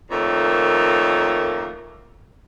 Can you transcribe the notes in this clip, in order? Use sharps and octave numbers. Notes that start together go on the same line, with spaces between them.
F2 D#3 A3 A#3 C#5